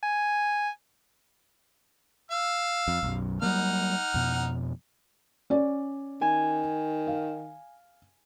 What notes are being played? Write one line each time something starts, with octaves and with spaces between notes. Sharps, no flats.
G#5
F5 E6
F2
B1 F#2
F#3 G3 A#3 D#4 F#5 F6
F2 B2
C#4 D5
D#3 G#5
F5